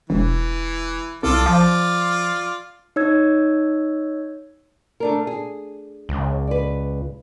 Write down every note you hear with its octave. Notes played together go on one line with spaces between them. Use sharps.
E1 E3
C2 F4 A4 D5
F3 F4 D5
D#4 C#5 E6 G#6
A3 D4 A#4
G#4
C#2
B4 D5